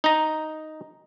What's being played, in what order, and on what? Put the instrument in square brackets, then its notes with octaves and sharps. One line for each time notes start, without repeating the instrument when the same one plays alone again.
[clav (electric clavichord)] D#4 A#5